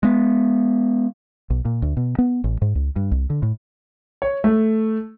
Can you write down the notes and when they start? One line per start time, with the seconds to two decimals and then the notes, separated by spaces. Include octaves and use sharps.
0.03 G#3 B3
1.50 B1
1.65 A#2
1.82 D2
1.97 B2
2.18 B3
2.44 A1
2.62 G#2
2.75 C#2
2.96 G2
3.11 C2
3.30 D3
3.42 A2
4.22 C#5
4.44 A3